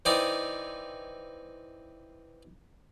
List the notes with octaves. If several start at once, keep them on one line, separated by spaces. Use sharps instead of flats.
E3 C4 D#4 D5 D#6